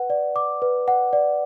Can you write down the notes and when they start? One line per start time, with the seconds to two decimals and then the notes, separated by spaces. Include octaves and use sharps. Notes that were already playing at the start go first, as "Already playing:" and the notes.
Already playing: B4 F#5
0.10 D5
0.36 D6
0.62 B4
0.88 F#5
1.13 D5